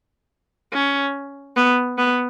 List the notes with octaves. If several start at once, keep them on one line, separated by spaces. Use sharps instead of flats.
C#4
B3
B3